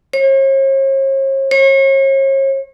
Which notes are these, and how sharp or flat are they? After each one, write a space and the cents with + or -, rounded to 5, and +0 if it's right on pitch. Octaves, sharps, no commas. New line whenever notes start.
C#5 -45
C#5 -40